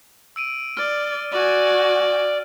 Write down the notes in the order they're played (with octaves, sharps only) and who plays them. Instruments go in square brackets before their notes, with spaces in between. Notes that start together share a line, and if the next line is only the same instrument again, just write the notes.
[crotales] E6 D7 D#7
[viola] D5 [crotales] F6 D7
[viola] F#4 G#5 [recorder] D5